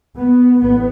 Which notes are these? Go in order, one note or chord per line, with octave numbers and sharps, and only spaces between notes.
B3
A1 B3